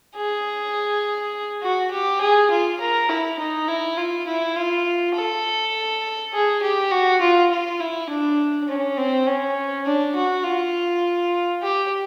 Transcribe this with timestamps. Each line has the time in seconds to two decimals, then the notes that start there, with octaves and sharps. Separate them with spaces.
0.15 G#4
1.62 F#4
1.91 G4
2.21 G#4
2.50 F4
2.80 A#4
3.09 E4
3.39 D#4
3.68 E4
3.97 F4
4.27 E4
4.56 F4
5.15 A4
6.33 G#4
6.62 G4
6.91 F#4
7.21 F4
7.51 F4
7.80 E4
8.09 D4
8.68 C#4
8.97 C4
9.27 C#4
9.85 D4
10.15 F#4
10.44 F4
11.62 G4